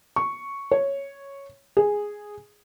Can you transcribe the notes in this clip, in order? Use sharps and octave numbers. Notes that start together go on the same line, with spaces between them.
C#6
C#5
G#4